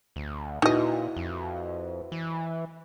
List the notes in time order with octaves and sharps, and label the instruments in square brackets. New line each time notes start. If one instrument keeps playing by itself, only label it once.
[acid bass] D2
[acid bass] A#2 [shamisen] D#4 D#5 [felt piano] E4 F#4 B4
[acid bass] F2
E3